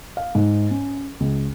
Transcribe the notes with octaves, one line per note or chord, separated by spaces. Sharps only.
F5
G#2
C#4
C#2